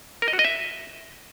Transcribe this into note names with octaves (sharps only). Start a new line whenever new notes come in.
A#4
D#5
F#4
D#5
E5